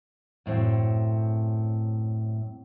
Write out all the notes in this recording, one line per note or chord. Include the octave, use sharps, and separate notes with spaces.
F#2 A2 C4